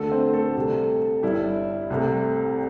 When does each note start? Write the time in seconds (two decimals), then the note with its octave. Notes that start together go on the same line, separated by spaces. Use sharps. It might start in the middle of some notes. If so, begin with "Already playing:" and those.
Already playing: D2 D3 A3 A4
0.11 C4 C5
0.34 A3 A4
0.55 C2 C3 A3
1.23 G1 G2 G3 E4
1.90 C2 C3 A3